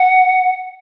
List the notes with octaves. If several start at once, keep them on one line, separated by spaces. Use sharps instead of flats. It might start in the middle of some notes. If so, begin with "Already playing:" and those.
Already playing: F#5